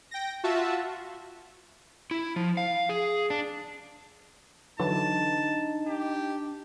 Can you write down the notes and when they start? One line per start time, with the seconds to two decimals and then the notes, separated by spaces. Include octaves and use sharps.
0.11 G5 A#6
0.44 F4 F#4 E5 A5
2.11 E4
2.36 F3
2.57 F5
2.89 G#4
3.30 D4
4.79 D3 E3 F#3 D4 D#4 A5
5.87 G4